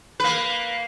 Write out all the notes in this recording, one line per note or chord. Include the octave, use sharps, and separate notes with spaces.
A#3 B4